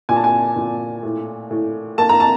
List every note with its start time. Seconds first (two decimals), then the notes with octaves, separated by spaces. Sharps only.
0.09 A#2 G#5
0.16 A5
0.24 G#5
0.56 A#2
1.03 A2
1.51 A2
1.98 A#3 A5
2.09 A#5
2.20 A5